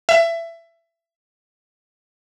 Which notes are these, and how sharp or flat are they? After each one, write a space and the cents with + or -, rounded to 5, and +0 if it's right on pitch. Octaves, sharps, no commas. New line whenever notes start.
E5 +20